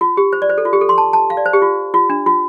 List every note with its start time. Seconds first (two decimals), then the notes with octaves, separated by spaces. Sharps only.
0.01 F4
0.17 G4
0.33 C5
0.42 D5
0.49 C5
0.58 A4
0.65 F4
0.73 G4
0.81 A4
0.89 C6
0.98 A5
1.13 A5
1.30 F5
1.37 D5
1.46 C5
1.53 G4
1.62 F4
1.94 F4
2.10 D4
2.26 F4